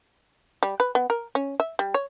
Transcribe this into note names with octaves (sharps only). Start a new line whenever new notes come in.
G3
B4
B3
A#4
C#4
E5
G3
C#5